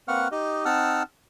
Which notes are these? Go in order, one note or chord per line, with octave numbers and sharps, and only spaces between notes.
A#3 C4 B4 F#5 C#6 F6
D#4 G4 D#5
C4 D#4 F#5 A5 E6 F6